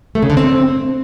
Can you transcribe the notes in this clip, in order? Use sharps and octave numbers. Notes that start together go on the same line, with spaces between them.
A3
C#3
D3
C4